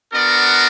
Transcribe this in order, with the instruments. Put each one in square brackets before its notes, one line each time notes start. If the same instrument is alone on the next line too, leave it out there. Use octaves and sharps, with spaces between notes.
[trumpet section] B3 D4 F#4 A#4 D5